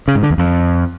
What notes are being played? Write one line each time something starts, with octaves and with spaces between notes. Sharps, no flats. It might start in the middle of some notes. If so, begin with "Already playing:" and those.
C#3
G#2
D3
E2
F2